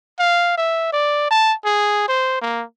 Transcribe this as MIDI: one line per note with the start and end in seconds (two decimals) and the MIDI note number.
0.19 0.54 77
0.58 0.90 76
0.93 1.28 74
1.31 1.54 81
1.65 2.04 68
2.08 2.40 72
2.41 2.64 58